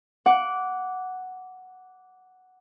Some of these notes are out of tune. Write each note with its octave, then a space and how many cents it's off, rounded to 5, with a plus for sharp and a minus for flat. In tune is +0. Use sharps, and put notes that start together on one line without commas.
F#5 +0 D6 -15